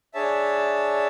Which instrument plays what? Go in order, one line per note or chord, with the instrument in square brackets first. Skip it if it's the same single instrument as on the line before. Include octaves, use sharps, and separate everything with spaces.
[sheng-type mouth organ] D4 G#4 C#5 E5 A5